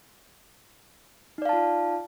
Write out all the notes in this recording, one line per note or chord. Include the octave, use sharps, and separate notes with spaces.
D#4 F4 D5 F5 A5